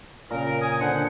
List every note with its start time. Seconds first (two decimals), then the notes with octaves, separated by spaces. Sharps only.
0.31 A#2 C#3 A#4
0.61 G#5 D#6
0.81 D3 C5 F#5